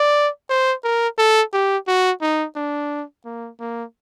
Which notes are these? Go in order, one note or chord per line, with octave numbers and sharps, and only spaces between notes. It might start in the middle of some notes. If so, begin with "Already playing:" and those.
Already playing: D5
C5
A#4
A4
G4
F#4
D#4
D4
A#3
A#3